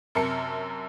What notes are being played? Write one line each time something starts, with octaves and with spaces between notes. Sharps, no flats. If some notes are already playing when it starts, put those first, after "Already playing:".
F#2 C3 A#4 A5 C#7